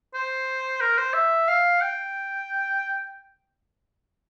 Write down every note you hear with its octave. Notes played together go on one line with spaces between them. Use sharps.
C5
A#4
C5
E5
F5
G5